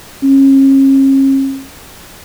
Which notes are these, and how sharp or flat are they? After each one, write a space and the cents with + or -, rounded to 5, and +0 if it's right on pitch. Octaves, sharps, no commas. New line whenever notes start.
C#4 -40